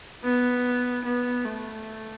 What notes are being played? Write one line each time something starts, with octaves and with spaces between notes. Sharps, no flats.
B3
B3
A3